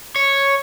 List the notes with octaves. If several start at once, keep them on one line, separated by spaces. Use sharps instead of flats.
C#5